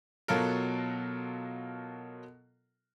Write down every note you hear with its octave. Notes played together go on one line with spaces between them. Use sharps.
B2 F#3 F4 A4 A#4